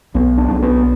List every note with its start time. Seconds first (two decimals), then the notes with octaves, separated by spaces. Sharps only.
0.15 B1 B3
0.38 D4
0.51 B1
0.63 B3